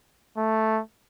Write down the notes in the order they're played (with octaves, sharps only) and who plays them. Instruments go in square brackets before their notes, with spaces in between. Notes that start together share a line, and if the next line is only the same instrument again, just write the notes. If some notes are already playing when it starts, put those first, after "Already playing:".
[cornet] A3